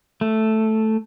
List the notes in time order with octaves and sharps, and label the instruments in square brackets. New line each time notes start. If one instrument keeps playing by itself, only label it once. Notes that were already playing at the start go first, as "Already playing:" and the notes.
[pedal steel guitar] A3